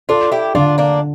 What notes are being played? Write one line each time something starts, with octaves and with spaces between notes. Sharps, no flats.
D4 F4 A4
E4 G4
D3 D4 F4
A#3 D4